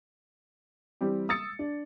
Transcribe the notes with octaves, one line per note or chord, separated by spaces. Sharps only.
E3 G3 C4 G4
D#6 E6 A6 C#7
D4